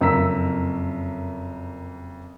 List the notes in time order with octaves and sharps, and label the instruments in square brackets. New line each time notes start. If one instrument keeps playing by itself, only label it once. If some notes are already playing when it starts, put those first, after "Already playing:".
[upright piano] F#1 F2 A#4 A#5 E6 B6